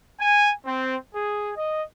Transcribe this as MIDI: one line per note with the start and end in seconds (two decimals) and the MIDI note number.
0.19 0.51 80
0.64 0.95 60
1.14 1.51 68
1.54 1.81 75